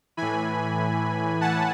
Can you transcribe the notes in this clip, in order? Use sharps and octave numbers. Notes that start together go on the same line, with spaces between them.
A2 E3 G#5 B5
F#5 A5